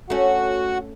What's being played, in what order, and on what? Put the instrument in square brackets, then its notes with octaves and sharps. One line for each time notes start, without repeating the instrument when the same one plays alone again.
[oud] A3 C#4 [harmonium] F#4 F#5